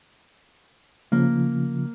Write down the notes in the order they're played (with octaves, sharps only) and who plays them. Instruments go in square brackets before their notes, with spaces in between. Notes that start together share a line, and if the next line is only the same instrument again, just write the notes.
[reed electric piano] C#3 F3 [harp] A#3